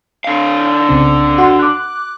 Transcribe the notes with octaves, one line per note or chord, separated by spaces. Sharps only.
D3 F5
C2 C#3 C4
F#4 F#5 C6
D6 F#6